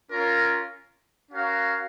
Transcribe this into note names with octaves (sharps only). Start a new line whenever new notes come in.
C#4 F4 A#4
C#4 F#4 A#4 F5